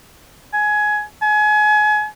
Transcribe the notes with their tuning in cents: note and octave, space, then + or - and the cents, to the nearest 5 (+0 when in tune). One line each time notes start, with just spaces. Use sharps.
G#5 +15
G#5 +30